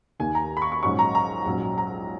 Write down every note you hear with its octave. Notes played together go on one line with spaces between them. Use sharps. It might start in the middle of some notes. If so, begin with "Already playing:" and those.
D#2 D#3 A#3 G#5
A#5
B5
C#6
C#6
A#1 G#2 F#3 C#4 C#6
A#5
A#5
A#1 G#2 F#3 C#4
A#5